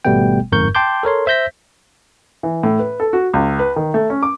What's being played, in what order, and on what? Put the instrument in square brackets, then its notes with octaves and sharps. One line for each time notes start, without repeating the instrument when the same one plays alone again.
[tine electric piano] G#1 B2 G3 A3 B3 G5
G1 F2 G#2 A#4 C#6 G6
G5 A5 C6 D6 G6
A4 A#4 C#5 C6
C5 E5 E6 G6 A#6 B6
[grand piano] E3
A2
B4
A4
F#4
C#2
B4
D#3
A3
C#4
D6